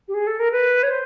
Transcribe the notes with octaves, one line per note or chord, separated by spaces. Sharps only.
G4
G#4
A4
A#4
B4
C#5
C5